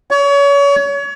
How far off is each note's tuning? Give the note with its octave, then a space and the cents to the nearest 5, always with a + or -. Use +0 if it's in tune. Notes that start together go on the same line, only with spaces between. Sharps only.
C#5 +30